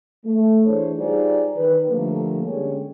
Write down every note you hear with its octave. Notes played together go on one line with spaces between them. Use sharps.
A3
E3 D4 G#4 C5 C#5
G3 D#4 F4 G#4 C5 D5
D#3 B4
D3 F3 G3 A3 A#3
D3 G3 G#3 C#4